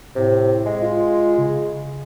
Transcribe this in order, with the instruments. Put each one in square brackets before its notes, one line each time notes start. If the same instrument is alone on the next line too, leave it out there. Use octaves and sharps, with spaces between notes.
[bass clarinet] A2 [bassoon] C3
[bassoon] G#3
[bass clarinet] F4
C#3